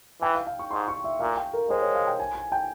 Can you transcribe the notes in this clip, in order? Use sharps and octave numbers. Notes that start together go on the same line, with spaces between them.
E3 G5
F5
F5
C#6
G#2 C6
C#6
E5
A#2 F5
G5
A#4
G#3 C5
C#5
F5
G5
G#5
G#5
G5